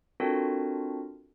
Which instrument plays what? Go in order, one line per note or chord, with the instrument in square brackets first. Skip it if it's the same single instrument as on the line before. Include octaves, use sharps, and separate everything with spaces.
[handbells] C4 D4 F4 F#4 A4 A#4